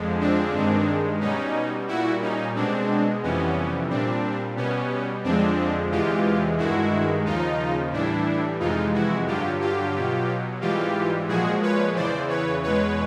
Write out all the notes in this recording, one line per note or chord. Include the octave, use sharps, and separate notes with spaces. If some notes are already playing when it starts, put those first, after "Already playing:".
Already playing: F2 D3 F3 G#3
C4 D4
G2 D#3 G#3
B2 G3 C#4 D#4
A#2 G3 E4 F#4
C#4 D#4
B2 G#3 C4 D4
F2 C3 E3 G3 B3 C#4
A#2 G3 C4 D4
B2 G3 B3 C#4
F2 D3 F3 G#3 C4 D4
E2 C3 E3 G#3 F4 G4
G2 D#3 G#3 E4 F#4
D#2 C#3 F3 D#4 F4
A2 E3 G3 D4 E4
F2 C3 E3 G#3 D#4 F4
E4 F#4
G2 D3 F#3 F4 G4
F4 G4
B2 F#3
G#2 E3 G3 F4 G4
A#2 F3 G#3 F#4 G#4
B4 C#5
E2 C#3 E3 C5 D5
B4 C#5
E2 B2 G#3 B4 C#5